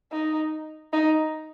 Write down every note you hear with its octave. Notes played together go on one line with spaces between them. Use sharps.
D#4
D#4